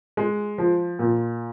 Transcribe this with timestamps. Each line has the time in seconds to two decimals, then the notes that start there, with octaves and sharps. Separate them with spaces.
0.17 G#3
0.58 F3
0.99 A#2